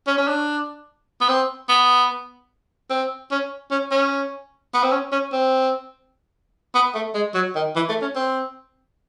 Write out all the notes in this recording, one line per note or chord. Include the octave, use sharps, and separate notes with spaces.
C#4
C#4
D4
B3
C4
B3
C4
C#4
C#4
C#4
B3
C4
C#4
C#4
C4
B3
A3
G#3
F#3
D#3
E3
A3
C#4
C4